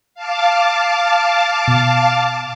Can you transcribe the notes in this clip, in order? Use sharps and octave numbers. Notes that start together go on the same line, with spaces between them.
F5 A5 D6
B2